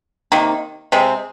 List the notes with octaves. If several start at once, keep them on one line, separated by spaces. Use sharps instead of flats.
C3 D#3 A#3
C3 G#3 C4